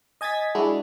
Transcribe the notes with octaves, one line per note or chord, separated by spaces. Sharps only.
D#5 G#5 G#6 A6 B6
G#3 D4 E4 F#4